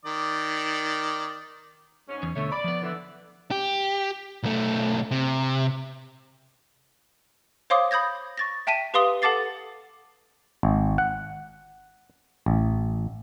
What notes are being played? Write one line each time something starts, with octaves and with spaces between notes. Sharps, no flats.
D#3 D5
G#2 C#4
E2
D2 B2 D3 A3 C#5
D5 B5
F3 B3
D3 E3
G4
B1 A3
C3
C5 C#5 F5 C6 D6 D#6
B5 D#6 G6 G#6 A#6
C#6 A6 A#6
E5 G5 A5 B6 D#7
G4 B4 F5 C6 D#6 G7
A4 F#5 A5 D6 A6 C7
G#1
F#5
A1